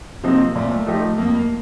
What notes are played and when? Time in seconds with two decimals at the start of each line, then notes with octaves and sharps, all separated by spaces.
0.23 C3 F3 A#3 C4 D#4
0.55 A#2 A3
0.87 F3 A3 D#4 G4
1.17 F2 A#3